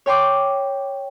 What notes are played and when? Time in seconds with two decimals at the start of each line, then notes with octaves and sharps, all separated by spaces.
0.06 C#5 G5 C6 D6